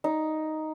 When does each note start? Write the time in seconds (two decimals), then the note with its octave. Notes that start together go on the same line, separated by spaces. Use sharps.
0.04 D#4